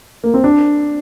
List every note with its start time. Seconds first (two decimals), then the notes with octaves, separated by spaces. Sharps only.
0.24 A#3
0.34 C4
0.44 D4